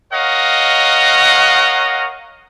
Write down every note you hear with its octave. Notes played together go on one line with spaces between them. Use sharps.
A#4 C#5 D#5 F5 F#5